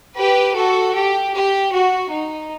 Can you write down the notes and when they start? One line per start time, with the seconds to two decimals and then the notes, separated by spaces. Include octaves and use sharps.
0.16 G4 B4
0.55 F#4 A4
0.94 G4
1.32 G4
1.71 F#4
2.10 D#4